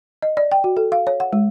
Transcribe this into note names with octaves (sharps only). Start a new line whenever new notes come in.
D#5
D5
G5
F#4
A4
F5
C#5
F#5
G#3